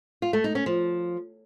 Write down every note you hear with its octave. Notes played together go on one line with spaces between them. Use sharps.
F4
A3
D#4
C#4
F3